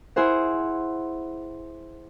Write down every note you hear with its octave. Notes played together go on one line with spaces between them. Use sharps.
E4 G#4 C5 F#5